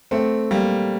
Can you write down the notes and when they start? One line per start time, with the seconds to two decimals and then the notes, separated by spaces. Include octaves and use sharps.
0.11 A3 C4
0.51 G3 A#3